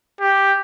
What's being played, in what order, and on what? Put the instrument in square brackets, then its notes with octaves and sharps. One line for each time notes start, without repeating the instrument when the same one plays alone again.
[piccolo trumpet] G4